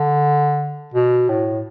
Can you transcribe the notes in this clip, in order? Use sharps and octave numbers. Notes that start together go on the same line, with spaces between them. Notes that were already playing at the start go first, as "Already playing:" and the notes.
Already playing: D3
B2
A2